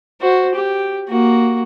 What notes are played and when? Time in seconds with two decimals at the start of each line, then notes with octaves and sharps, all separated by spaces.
0.21 F#4 C5
0.55 G4
1.08 A#3 F#4